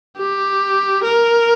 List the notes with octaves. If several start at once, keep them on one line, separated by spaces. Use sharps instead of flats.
G4
A#4